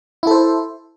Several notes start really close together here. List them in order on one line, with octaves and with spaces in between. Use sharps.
E4 A4 C5